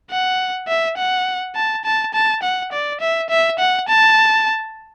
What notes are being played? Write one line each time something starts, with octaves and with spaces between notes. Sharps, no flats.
F#5
E5
F#5
A5
A5
A5
F#5
D5
E5
E5
F#5
A5